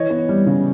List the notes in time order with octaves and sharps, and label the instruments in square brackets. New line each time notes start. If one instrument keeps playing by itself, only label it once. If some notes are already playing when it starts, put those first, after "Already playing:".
Already playing: [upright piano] E3 C#5 D#5
B3
G3
C#3